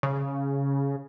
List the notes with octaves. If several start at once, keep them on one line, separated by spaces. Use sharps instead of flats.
C#3